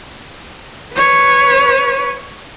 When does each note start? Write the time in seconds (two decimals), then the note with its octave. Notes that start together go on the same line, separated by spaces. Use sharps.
0.94 B4 C#5